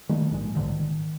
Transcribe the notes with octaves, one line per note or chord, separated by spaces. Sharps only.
D#3 G3 A3 A#3
A#1 G#2 G#3
B1 G#2 D3 D#3
D#3